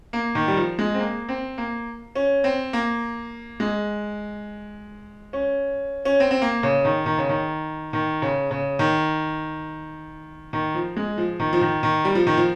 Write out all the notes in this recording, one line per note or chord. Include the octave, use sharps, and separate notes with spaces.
A#3
D#3
G3
F3
G#3
C4
A#3
C4
A#3
C#4
C4
A#3
G#3
C#4
C#4
C4
C4
A#3
C#3
D#3
D#3
C#3
D#3
D#3
C#3
C#3
D#3
D#3
F3
G#3
F3
D#3
F3
D#3
D#3
G3
F3
D#3
F3